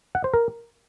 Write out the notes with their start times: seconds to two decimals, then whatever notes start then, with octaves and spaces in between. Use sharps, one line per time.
0.15 F#5
0.24 C5
0.34 A#4